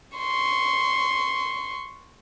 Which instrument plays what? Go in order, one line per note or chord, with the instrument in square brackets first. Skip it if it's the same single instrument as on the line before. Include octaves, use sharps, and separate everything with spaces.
[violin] C6 C#6